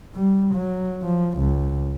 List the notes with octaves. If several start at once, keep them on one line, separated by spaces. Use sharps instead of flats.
G3
F#3
F3
C#2